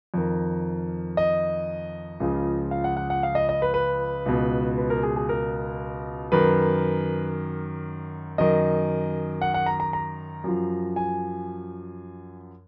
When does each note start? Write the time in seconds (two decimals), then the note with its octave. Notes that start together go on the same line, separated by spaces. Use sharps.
0.14 F2 D#3
1.17 D#5
2.20 C#2 C#3 F3
2.71 F5
2.84 F#5
2.97 F#5
3.10 F#5
3.23 F5
3.35 D#5
3.49 D#5
3.62 B4
3.74 B4
4.26 C#2 B2
4.78 B4
4.90 A#4
5.03 G#4
5.16 G#4
5.29 A#4
6.32 F#2 D#3 B4
8.38 F#2 D#3 D#5
9.41 F#5
9.54 F#5
9.66 A#5
9.80 A#5
9.93 A#5
10.44 F#2 F3
10.96 G#5